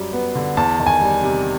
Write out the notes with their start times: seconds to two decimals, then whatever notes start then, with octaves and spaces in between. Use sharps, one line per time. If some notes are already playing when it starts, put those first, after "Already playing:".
Already playing: F#2 G3
0.13 B3
0.35 D3
0.57 E2 A5
0.80 D#3
0.86 G#5
1.01 G3
1.23 C3